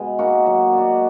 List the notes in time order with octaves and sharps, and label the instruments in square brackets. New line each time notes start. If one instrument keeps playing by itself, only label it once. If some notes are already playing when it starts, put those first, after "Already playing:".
Already playing: [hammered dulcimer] B2 [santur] G#3
[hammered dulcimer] A#3 D#4 F#4
F#3
D4 F#4